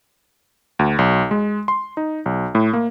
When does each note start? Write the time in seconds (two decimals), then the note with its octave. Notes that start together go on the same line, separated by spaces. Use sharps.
0.79 D2
0.99 B1
1.31 G#3
1.68 C6
1.97 D#4
2.26 B1
2.55 A2
2.73 A#3